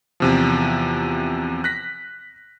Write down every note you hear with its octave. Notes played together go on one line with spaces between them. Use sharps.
E2 C3 F3
F#6 A#6 B6